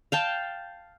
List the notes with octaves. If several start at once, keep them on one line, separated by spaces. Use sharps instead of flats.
F5 G5 A5